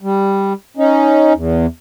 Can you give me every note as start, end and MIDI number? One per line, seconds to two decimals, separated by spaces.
0.01 0.53 55
0.77 1.33 61
0.77 1.33 63
1.34 1.66 40